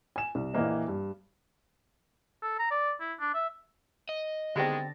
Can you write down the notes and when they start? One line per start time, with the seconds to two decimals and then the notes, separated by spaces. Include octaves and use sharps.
0.16 G#5 E7
0.35 C2
0.54 A#1 E3 A#3 D#5
0.88 G2
2.42 A4
2.59 A#5
2.71 D5
3.00 E4
3.19 D4
3.34 E5
4.09 D#5
4.56 D3 D#3 G3 G#3 B3 C4 A6 A#6